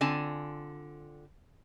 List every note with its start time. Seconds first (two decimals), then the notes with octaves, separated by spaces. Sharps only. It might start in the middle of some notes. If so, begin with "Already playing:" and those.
0.01 D3 C4 F4 G#5 A5